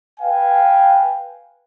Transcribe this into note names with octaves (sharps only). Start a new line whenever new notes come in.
B4 F5 G5 G#5